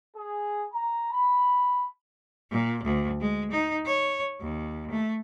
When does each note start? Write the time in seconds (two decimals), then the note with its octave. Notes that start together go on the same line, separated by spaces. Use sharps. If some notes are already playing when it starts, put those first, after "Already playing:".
0.16 G#4
0.74 A#5
1.12 B5
2.51 A#2
2.84 D2
3.20 G#3
3.51 D#4
3.86 C#5
4.41 D#2
4.91 A3